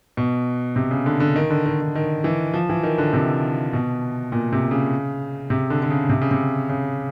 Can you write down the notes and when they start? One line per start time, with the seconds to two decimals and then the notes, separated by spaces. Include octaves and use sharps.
0.17 B2
0.76 C3
0.91 C#3
1.06 D3
1.20 D3
1.36 D#3
1.50 D3
1.66 D#3
1.81 D#3
1.95 D#3
2.24 E3
2.54 F3
2.69 E3
2.83 D#3
2.98 D3
3.13 C3
3.73 B2
4.32 A#2
4.52 C3
4.71 C#3
5.50 C3
5.70 D3
5.83 D3
5.90 C#3
6.09 C3
6.21 C#3
6.31 C3
6.69 C#3